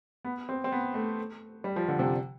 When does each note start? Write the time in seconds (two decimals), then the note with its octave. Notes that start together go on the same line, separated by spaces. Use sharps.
0.25 B3
0.49 C4
0.64 C4
0.72 B3
0.94 A3
1.64 G3
1.76 F3
1.88 D3
1.99 C3